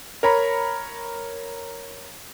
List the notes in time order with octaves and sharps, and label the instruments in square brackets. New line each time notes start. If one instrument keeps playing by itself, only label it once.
[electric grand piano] A#4 C#5 A#5 B5